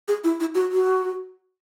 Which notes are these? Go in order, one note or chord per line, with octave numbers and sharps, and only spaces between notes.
G#4
E4
E4
F#4
F#4